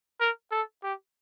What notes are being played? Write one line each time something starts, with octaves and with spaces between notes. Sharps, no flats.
A#4
A4
G4